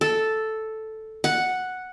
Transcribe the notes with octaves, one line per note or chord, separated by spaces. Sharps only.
A4
F#5